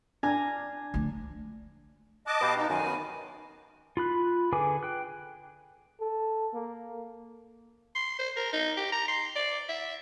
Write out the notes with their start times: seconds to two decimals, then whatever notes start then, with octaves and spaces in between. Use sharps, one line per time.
0.23 D4 G#5 A#5 F6
0.94 D2 F3
2.27 D#5 A5 D6 F#6
2.41 B2 G4 B4 F5
2.57 D#4
2.70 F#2 D#3 G#5
2.83 B3 C#4
3.97 F4 B5 F#6
4.52 D3 G#4 B4 G#5 D6
4.83 G5 F#6
6.00 A4
6.54 A#3
7.95 C6
8.19 C5
8.36 A#4
8.53 D#4
8.77 G4
8.92 A#5
9.08 C6
9.35 D5
9.69 E5